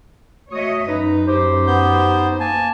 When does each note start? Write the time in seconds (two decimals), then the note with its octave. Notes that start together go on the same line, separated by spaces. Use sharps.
0.52 A3 F#4 C#5 D#5 E5 D#6
0.88 F#2 D#4 B4
1.27 D#4 G4 C5
1.67 B3 G6
2.40 A#3 G#5 A5